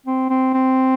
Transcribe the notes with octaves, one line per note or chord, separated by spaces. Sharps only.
C4
C4
C4